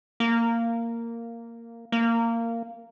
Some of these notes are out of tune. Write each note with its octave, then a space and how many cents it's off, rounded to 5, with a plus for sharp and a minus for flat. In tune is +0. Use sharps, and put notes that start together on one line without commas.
A#3 -10
A#3 -15